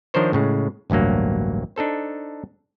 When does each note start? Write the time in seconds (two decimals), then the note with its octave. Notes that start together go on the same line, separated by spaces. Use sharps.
0.14 D#3 F3 D4 A#4 C5 C#5
0.33 A2 C#3 G#3
0.90 A1 D2 G2 F#3 A#3
1.76 D4 D#4 A4 C5